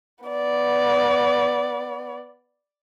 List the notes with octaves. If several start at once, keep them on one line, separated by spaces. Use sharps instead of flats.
B3 D5